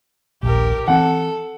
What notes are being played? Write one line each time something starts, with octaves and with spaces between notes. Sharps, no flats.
D#1 A#1 G4 A#4
E3 C4 A4 F#5